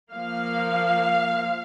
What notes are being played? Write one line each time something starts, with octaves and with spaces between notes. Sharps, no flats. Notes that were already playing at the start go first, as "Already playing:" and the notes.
F3 A#3 F5